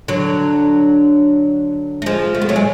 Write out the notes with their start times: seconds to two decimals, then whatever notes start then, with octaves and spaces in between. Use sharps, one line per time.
0.08 D3 F#3
2.02 A3
2.06 F3 G#3
2.35 A3
2.41 B3
2.49 F#3 A3
2.56 G#3